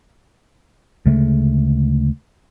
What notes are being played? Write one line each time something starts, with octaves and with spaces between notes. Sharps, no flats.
D2 C#3 G#3 A3